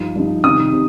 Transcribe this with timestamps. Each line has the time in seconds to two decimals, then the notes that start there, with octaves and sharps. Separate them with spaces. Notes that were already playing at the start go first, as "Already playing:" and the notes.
Already playing: G2 F3 D#4
0.16 G2 F3 D#4
0.44 C3 D#3 G3 D#4 D#6
0.73 C3